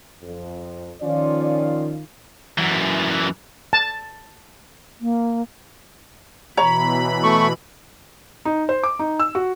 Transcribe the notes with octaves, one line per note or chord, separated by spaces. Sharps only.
F2
D#3 F3 C#4 F4 D5
F#2 E3
A5
A#3
B2 E3 C#5 A#5 B5
A3 C#6
D#4
C5
D6
D#4
E6
F#4